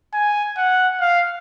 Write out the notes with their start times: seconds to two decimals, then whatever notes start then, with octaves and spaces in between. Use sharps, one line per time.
0.13 G#5
0.58 F#5
1.01 F5